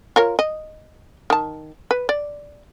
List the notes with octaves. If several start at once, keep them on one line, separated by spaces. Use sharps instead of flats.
F4 A#4 C#5
D#5
D#3 A5
B4
D5